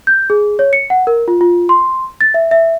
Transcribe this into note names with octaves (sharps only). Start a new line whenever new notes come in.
G6
G#4
C#5
C#7
F#5
A#4
F4
F4
C6
A6
E5
E5